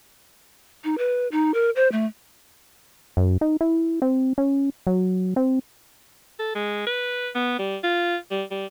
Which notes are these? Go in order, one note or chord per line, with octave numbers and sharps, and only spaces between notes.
D#4
B4
D#4
A#4
C5
A3
F#2
D#4
E4
C4
C#4
F#3
C4
A4
G#3
B4
B3
G3
F4
G3
G3